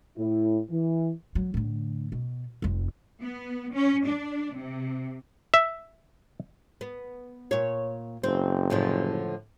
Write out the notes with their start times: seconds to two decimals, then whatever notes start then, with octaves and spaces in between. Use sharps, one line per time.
0.17 A2 E4
0.69 E3
1.35 F#3
1.54 A2 D3
2.12 B2
2.62 F1 F2
3.21 B3
3.74 C#4
4.05 D4
4.54 C3
5.54 E5
6.81 B3
7.51 A#2 C#5
8.24 F#1 C4
8.70 A2 D3 F3